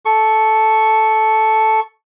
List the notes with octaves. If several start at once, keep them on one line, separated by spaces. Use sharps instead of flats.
A4 C#6